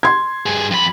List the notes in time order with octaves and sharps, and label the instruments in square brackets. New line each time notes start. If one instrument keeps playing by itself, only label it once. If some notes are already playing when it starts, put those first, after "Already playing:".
[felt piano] C6 G#6
[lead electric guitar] G2 G#4
F2 B5